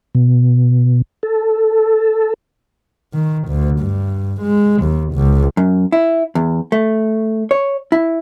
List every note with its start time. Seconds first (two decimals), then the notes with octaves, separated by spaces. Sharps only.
0.15 B2
1.23 A4
3.14 D#3
3.48 D2
3.80 G2
4.41 G#3
4.83 D#2
5.15 C#2
5.57 F#2
5.92 E4
6.35 E2
6.72 A3
7.51 C#5
7.92 E4